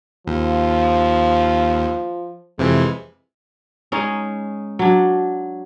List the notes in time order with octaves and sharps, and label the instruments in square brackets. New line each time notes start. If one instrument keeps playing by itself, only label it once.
[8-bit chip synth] D#2 [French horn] F3
[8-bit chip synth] F2 C3 E3 [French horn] G#3
[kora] G#3 C#4 D#4
F#3 D4